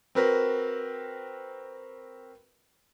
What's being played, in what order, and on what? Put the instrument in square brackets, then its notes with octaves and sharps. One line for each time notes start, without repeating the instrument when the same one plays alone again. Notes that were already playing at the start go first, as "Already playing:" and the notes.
[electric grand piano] C4 F#4 A#4 B4